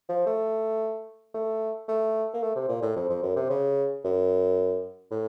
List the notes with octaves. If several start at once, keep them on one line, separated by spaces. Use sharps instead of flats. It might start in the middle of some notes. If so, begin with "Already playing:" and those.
F3
A3
A3
A3
A#3
A3
C3
A#2
A2
F2
F2
F#2
C3
C#3
F#2
A2